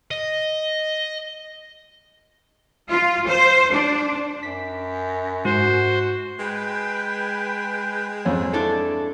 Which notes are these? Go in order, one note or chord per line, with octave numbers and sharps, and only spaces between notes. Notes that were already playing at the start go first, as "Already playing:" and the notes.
D#5
F4
C5
D4
F#2 B6
G#2 F#4 C5
G#3 B4 G5
F2 C#4
D4 E4 A4